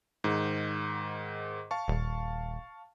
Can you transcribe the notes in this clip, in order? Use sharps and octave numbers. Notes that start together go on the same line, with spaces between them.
G#2 D#3
F5 A5 C#6
D#1